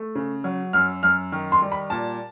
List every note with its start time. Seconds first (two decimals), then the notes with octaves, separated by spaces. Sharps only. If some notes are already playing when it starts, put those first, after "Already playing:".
Already playing: A3
0.15 C#3
0.44 F#3
0.73 F#2 F6
1.03 F#2 F6
1.32 D#3
1.52 C6
1.62 G3
1.72 B5
1.90 A#2 A5